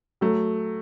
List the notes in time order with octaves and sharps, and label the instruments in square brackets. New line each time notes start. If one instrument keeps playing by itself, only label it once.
[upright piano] F#3 A3